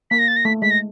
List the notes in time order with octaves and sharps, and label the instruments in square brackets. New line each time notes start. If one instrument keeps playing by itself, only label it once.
[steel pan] A#3 [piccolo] B6
[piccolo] A#6
A6
A#6
[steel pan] A3 [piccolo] B6
[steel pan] G#3 [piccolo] B6
[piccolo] A#6